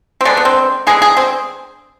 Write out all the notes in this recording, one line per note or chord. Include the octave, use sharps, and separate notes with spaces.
C4
D3 G#3 B3 D4
B3
C4
D3 G#3 B3 G#4
G#4
C4